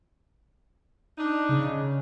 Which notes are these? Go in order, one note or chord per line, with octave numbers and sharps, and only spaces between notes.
D4 D#4
C#3